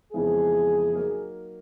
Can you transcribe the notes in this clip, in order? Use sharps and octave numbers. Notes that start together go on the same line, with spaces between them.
F2 C#3 E3 G#3 B3 G#4
F#3 A#3 D#4